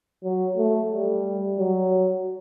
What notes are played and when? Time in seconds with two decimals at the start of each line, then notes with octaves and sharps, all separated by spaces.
0.24 F#3
0.57 A3
0.92 G3
1.59 F#3